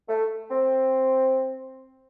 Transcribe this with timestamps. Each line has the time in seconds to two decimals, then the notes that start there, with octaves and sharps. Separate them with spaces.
0.09 A3
0.51 C4